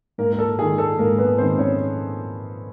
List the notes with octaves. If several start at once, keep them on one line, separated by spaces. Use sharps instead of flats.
G#2 A#3 A#4
A#4
A4
D#3 G#3 G#4
A4
G#2 A#3 A#4
B3 B4
D#3 G#3 C4 C5
C#4 C#5